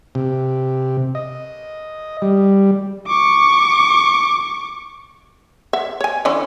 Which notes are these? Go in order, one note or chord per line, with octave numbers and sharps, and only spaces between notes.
C3
D#5
G3
C#6 D6
E5 F#5
C#5 G#5
D3 E3 C#4